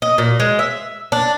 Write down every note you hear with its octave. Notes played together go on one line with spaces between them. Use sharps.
D#5
A#2
G#3
E5
D4